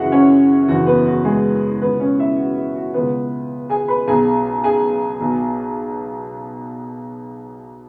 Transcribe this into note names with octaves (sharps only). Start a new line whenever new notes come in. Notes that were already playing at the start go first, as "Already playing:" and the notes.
Already playing: F#1 F#2 E3 E4 F#4 G#4 E5 F#5
C#4 C#5
F#1 E2 E3 F#4
B3 B4
F#4
G#3 G#4
C#2 B2 B3 B4
C#4 C#5
E4 E5
F#4
E4
F#4
C#2 B2 B3 B4
G#4 G#5
B4 B5
B1 B2 G#4 G#5
G#4 G#5
B1 B2